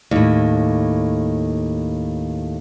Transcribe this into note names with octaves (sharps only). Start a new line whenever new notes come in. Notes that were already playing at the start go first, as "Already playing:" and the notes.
D#2 A2